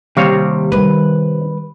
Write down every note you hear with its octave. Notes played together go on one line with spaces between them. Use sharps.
D#2 C3 G3 C#5 F5
D#3 G3 B4